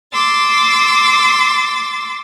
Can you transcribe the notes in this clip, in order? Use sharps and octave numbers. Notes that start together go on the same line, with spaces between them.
C6 D6 E6 A6